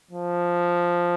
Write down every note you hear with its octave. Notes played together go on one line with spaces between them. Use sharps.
F3